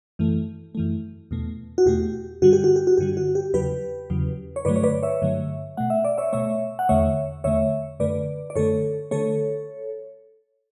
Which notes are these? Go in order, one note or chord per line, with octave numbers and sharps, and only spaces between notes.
F#2 E3 A3
F#2 E3 A3
E2 B2 A3
F#4
E2 B2 A3 G4
G2 D3 G3 F#4
G4
F#4
G4
F#4
G2 D3 G3 G4
F#4
G4
E2 C#3 F#3 G4 B4
E2 C#3 F#3
C#5
G2 D3 F#3 A3 B4 D5
C#5
B4 D5
C#5 E5
G2 D3 F#3 A3
B2 A3 F#5
E5
D5
C#5 E5
B2 A3 C#5 E5
F#5
E2 D3 A3 C#5 E5
E2 D3 A3 C#5 E5
F#2 D3 A3 B4 D5
D5
F#2 D3 A3 A4 C#5
D3 A3 A4 C#5